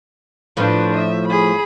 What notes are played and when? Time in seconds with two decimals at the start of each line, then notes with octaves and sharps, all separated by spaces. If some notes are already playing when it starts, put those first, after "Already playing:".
0.57 A2 F3 D4 B4
0.96 E5
1.28 G#4 B5